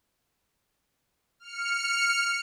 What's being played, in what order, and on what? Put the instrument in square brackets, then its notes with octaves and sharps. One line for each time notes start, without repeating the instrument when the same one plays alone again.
[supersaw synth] F6 C#7